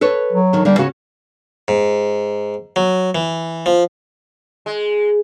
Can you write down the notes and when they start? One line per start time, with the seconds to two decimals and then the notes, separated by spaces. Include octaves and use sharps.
0.01 A4 B4 C#5
0.33 F#3
0.53 D3 D#3
0.65 D3 G3 A#3
0.78 C#3 C#4 F#4 C#5
1.68 G#2
2.76 F#3
3.15 E3
3.66 F3
4.66 G#3